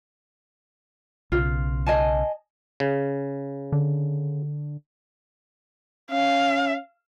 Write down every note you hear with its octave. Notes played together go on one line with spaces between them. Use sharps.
B1 C#3 F4
D#5 G#5 A5
C#3
D3
C#4 F5